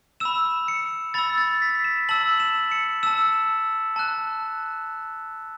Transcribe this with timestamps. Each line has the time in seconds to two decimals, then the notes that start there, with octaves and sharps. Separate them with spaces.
0.20 B5 E6 E7
0.68 C#7
1.14 B5 E6 A6
1.38 A6
1.62 B6
1.84 E7
2.09 A5 E6 F#7
2.40 E7
2.72 C#7
3.03 A5 E6 E7
3.96 A5 F#6